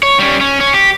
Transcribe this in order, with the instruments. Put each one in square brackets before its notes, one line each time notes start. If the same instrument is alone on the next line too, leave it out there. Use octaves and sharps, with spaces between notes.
[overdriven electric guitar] C#5
G3 C#4
C#4
C#4
G4